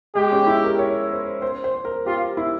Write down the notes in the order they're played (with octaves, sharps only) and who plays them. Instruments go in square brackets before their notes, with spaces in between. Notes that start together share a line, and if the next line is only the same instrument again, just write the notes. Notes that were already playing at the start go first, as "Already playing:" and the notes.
[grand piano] G#3 [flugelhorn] G4
[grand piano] C#4
E4
A#4
C#5
C5
C5
C5
A#4
[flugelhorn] F4 [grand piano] G4
[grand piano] E4